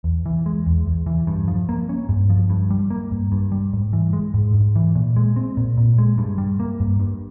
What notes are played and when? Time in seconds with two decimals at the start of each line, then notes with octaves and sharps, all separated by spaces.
0.04 E2
0.26 E3
0.46 G#3
0.66 E2
0.87 E2
1.06 E3
1.27 G2
1.48 F3
1.69 A#3
1.89 C#4
2.09 G2
2.30 F3
2.50 G2
2.70 G3
2.90 A#3
3.12 G2
3.32 G2
3.52 G3
3.73 G#2
3.93 E3
4.13 G#3
4.34 G#2
4.54 G#2
4.76 E3
4.95 A#2
5.16 G#3
5.36 C4
5.57 A#2
5.77 A#2
5.98 G#3
6.18 G2
6.38 G3
6.60 A#3
6.80 G2
7.00 G2